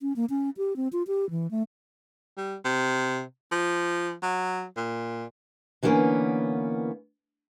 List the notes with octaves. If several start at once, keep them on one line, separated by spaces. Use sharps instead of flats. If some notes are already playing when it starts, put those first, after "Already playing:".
C#4
A#3
C#4
G4
C4
F4
G4
E3
A3
G3
C3
F3
F#3
A#2
D3 E3 G3 A#3 B3 C#4